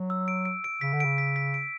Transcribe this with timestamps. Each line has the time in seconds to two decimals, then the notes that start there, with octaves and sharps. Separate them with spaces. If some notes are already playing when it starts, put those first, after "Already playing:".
Already playing: F#3
0.10 E6
0.28 D7
0.45 D7
0.64 D7
0.81 C#3 B6
0.93 D3
1.00 C#3 D7
1.18 B6
1.36 B6
1.54 D7